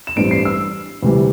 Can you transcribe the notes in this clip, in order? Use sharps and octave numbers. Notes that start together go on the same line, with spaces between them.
E7
A1 G2 G3 C4 D7
C7
E6
D2 C3 E3 G3